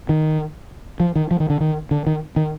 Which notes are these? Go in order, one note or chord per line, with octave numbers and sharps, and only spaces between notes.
D#3
F3
D#3
F3
D#3
D3
D#3
D3
D#3
D#3